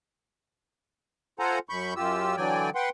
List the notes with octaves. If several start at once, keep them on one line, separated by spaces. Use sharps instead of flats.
F4 A4 C5 F#5 G#5 A#5
F#2 B5 C#6 G6
F#2 F4 G4 E6
D3 E3 F#3 D5 G5 G#5
B4 F#5 G5 C6